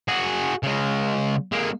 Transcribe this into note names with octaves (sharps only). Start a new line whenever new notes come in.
F#4 G#4
C#3 G#3
G#3 A#3